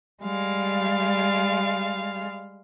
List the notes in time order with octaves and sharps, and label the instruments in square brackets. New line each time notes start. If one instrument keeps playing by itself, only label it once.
[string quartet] G3 G#3 F5